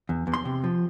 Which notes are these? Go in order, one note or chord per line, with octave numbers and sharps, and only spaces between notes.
E2
E2
C6
C3
F3